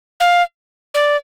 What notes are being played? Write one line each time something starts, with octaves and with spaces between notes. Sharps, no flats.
F5
D5